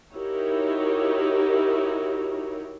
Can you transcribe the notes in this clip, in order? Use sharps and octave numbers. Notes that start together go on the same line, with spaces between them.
D#4 E4 F#4 G4 A#4 C#5